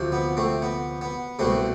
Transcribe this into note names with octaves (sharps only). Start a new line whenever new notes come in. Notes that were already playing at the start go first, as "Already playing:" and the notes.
Already playing: D2 C3 F3
B3
A3 C4
B3
B3
C2 B2 G3 A3 C4